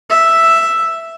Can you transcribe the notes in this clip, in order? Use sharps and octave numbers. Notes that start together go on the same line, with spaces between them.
E5